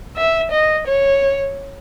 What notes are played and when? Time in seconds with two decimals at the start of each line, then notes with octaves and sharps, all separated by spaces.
0.16 E5
0.51 D#5
0.87 C#5